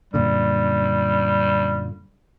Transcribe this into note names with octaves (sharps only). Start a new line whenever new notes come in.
F#2 A#2 D3 G3